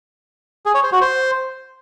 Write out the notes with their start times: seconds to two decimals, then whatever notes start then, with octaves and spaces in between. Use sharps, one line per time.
0.66 G#4
0.75 C#5
0.83 C5
0.92 F#4
1.01 C5